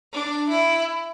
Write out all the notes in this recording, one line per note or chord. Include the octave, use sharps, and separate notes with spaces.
D4
E4